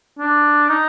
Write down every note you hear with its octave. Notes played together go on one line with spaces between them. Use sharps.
D4
D#4